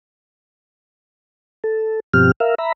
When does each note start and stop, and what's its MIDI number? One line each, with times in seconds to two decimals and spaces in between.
1.64 2.00 69
2.14 2.31 43
2.14 2.31 47
2.14 2.31 53
2.14 2.31 60
2.14 2.31 67
2.14 2.31 89
2.40 2.55 70
2.40 2.55 76
2.40 2.55 77
2.58 2.72 76
2.58 2.72 82
2.58 2.72 83